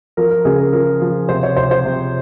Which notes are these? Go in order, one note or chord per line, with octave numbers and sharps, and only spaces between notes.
F3 A#4
A#4
C#3 G#4
A#4
F3 A#4
F3
C3 C5
C#5
C3 C5
C5
C3